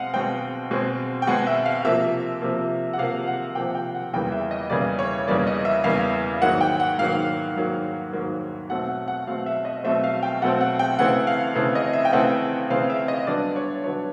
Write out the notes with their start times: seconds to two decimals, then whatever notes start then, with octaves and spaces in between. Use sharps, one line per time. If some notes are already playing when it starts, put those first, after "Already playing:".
Already playing: B2 G#3 C4 D#5 F5 F#5
0.14 B2 G#3 C4 G5
0.71 B2 G#3 C4
1.22 G5
1.27 B2 G#3 C4 F#5
1.47 E5
1.66 F5
1.84 C3 F3 A#3 E5
2.42 C3 F3 A#3
2.93 F#5
2.98 C3 F3 A#3 F5
3.28 F#5
3.55 C3 F3 A#3 G5
3.75 G5
3.95 F#5
4.13 E2 C#3 E3 G3 A#3 G5
4.32 E5
4.51 D#5
4.70 E2 C#3 E3 G3 A#3 D5
4.99 C#5
5.27 E2 C#3 E3 G3 A#3 D5
5.47 D#5
5.65 E5
5.84 E2 C#3 E3 G3 A#3 F5
6.41 G#2 D#3 F#3 A#3 F#5
6.61 G5
6.80 F#5
6.98 G#2 D#3 F#3 A#3 F5
7.56 G#2 D#3 F#3 A#3
8.13 G#2 D#3 F#3 A#3
8.70 B2 F#3 A3 C4 F#5
8.89 F#5
9.08 F#5
9.27 B2 F#3 A3 C4 F5
9.46 E5
9.65 D#5
9.84 B2 F#3 A3 C4 E5
10.04 F5
10.23 G5
10.42 B2 F#3 A3 C4 F#5
10.61 F#5
10.79 G5
10.99 C#3 E3 A3 C4 F#5
11.27 F5
11.55 C#3 E3 A3 C4
11.75 D#5
11.93 E5
12.05 G5
12.12 C#3 E3 A3 C4 F#5
12.70 C#3 E3 A3 C4 F5
12.90 E5
13.08 D#5
13.27 G2 D3 F#3 B3 D5
13.56 C#5
13.84 D3 F#3 B3 C#5